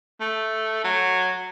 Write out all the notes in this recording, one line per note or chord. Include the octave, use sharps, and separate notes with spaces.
A3
F#3